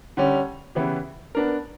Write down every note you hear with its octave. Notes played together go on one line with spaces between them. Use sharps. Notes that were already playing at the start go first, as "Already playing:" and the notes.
D3 G3 C#4 G4
C#3 E3 B3 E4 G4
B3 D4 A#4